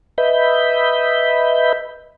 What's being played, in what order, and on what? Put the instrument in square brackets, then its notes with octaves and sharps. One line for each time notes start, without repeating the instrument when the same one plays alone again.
[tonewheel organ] B4 D#5 E5 B5 G6